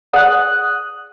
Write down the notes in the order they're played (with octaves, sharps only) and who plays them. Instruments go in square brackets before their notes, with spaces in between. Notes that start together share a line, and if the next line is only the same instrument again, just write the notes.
[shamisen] G#4 D5 F#5 [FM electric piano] D#6 F#6